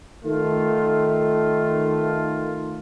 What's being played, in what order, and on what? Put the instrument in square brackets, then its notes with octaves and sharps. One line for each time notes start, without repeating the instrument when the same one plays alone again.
[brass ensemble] D#3 A3 F4